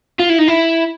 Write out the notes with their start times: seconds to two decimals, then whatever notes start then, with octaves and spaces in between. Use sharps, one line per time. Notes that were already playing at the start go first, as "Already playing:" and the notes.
0.19 F4
0.29 E4
0.39 D#4
0.48 E4